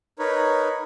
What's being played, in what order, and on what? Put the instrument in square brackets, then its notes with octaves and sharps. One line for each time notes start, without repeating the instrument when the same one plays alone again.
[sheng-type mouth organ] D#4 A#4 B4 C#5